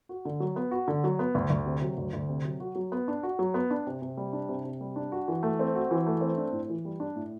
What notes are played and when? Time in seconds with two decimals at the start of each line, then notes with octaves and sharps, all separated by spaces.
0.09 F#4
0.25 D3
0.40 F#3
0.56 B3
0.71 F#4
0.88 D3
1.04 F#3
1.19 B3
1.35 D2
1.50 D2
1.66 C3
1.82 F#3
1.98 D2
2.13 D2
2.29 C3
2.45 F#3
2.60 F#4
2.75 F#3
2.92 B3
3.08 D4
3.23 F#4
3.39 F#3
3.54 B3
3.70 D4
3.87 C3
4.02 C3
4.17 G3
4.33 D4
4.49 C3
4.65 C3
4.81 G3
4.96 D4
5.12 F#4
5.28 E3
5.43 A3
5.59 C4
5.75 F#4
5.91 E3
6.07 A3
6.21 C4
6.38 D4
6.52 A2
6.69 E3
6.85 G3
7.00 D4
7.16 A2